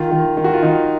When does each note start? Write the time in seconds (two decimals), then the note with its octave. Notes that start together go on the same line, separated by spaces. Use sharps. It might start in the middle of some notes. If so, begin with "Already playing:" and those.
Already playing: D#3 F4
0.11 D#3
0.37 D#3
0.44 F#4
0.53 F4
0.63 D#3 D#4